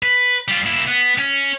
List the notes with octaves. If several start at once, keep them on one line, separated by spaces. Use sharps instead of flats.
B4
G3 F4
A#3 E4
B3
C#4